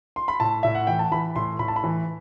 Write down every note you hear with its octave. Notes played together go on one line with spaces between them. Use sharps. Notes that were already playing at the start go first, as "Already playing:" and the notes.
C6
B5
A2 A5
A2 E5
F#5
E3 G5
A5
E3 B5
A2 C6
A2 B5
A5
B5
E3